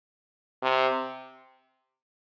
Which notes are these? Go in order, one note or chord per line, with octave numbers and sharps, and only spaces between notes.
C3